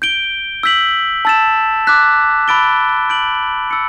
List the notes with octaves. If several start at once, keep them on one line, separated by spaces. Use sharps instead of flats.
G6 D7 G7
E6 G6 B6 F#7
A5 E6 A6 E7
D6 F#6 B6
B5 E6 A6 D7 G7
G6 D7 F#7
E6 A6 C#7